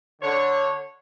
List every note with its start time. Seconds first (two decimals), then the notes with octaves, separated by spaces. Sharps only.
0.22 D3 C#5